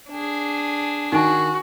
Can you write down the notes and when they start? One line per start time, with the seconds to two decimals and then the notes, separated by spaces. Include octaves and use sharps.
0.11 D4 G#4
1.12 D#3 D#4 F#4 G#5